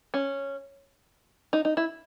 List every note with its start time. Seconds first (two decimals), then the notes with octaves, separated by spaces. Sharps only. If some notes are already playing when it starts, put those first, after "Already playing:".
0.14 C#4
1.53 D#4
1.65 D#4
1.77 E4